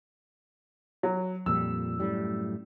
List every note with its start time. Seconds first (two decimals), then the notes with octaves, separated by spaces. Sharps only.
1.03 F#3
1.46 F2 A#2 G3 E6
2.00 F#2 A2 G3